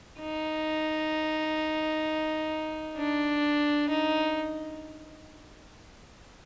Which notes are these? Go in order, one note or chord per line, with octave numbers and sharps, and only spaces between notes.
D#4
D4
D#4